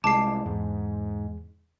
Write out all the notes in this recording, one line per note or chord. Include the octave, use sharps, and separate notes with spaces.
C2 G#3 A5 D6 C7
E2 G#2